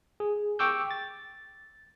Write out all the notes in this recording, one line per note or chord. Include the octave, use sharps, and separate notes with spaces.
G#4
G5 C#6 D6 E6 G6
A6